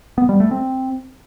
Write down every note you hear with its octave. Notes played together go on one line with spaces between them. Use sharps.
B3
G3
A3
C4